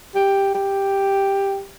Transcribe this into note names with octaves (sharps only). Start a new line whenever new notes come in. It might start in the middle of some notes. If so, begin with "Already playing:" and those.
G4
G4